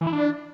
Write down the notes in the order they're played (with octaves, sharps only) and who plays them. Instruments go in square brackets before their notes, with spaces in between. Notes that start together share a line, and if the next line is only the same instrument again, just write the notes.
[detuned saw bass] E3
E4
D4